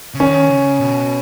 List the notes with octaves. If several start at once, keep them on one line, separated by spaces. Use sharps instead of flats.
C#3
D#3 C#4
C#3
B2